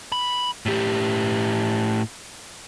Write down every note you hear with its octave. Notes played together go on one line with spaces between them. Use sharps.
B5
A2 G4